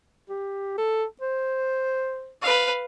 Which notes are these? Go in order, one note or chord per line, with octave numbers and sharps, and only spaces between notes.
G4
A4
C5
B4 F5